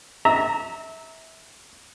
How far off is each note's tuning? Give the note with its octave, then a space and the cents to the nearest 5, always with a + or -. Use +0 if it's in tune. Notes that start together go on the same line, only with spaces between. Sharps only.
E5 -25 A#5 +0